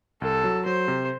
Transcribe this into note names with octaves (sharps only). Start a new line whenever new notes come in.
C2 A4
F#3
F#3 C5
C3